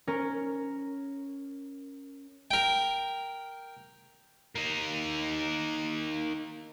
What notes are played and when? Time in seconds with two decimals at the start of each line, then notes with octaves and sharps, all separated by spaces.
0.07 C#4 A#4
2.51 A#4 G5
4.56 A#3 D#4